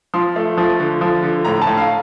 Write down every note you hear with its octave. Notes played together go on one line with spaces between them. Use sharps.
F3 C6
A3
F3
D3
F3
D3
A2 A#5
A5
A2
F5